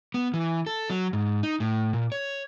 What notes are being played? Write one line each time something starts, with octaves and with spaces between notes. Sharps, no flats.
B3
E3
A4
F#3
G#2
D#4
A2
A#2
C#5